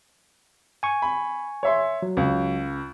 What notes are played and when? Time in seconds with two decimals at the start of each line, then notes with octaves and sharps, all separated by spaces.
0.83 G#5 C#6
1.02 B5
1.63 C#5 E5 C6
2.02 F#3
2.17 C#2